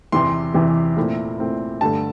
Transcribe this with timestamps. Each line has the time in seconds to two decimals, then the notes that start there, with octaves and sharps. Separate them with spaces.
0.12 E2 C3 E3 C6
0.54 E2 C3 E3
0.97 A#2 A3 C4 E4
1.39 A#2 A3 C4 E4
1.81 G2 D3 A3 A5